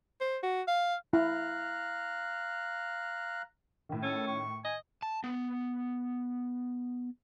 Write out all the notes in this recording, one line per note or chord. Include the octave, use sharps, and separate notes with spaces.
C5
F#4
F5
E4 F5 A#5 F#6
A2 D#3
C#4 A4
C#6
D#5 G#5
A5
B3